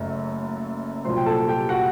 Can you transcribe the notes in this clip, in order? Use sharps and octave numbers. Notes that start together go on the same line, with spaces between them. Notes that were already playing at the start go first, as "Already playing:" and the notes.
Already playing: F#1 F#2 F#3 A3
C2 A#2 F#3 C5 C6
G5
A4 A5
G4 G5
F#4 F#5